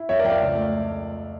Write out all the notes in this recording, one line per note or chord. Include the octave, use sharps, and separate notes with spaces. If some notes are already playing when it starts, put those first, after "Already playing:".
Already playing: E4
F2 C#5 E5
A#4 D5
F2 G5
D5 F5
C#2
A3